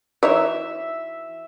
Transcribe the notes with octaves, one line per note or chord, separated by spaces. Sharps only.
E3 D#4 C#5 E5